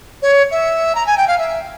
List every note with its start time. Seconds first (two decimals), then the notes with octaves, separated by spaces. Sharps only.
0.22 C#5
0.51 E5
0.95 A#5
1.07 G#5
1.17 G5
1.27 F5
1.38 E5